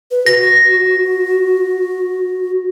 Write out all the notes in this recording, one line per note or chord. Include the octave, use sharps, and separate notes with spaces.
B4
F#4 A#6